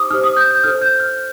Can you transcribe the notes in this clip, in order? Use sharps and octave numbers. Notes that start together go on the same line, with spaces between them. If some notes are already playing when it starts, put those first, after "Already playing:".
Already playing: D#4 G4 C5 D6 D#6
D#4 G4 C5 F6
D#6
G6
G6
D#4 A4 C5 F6
G6
F6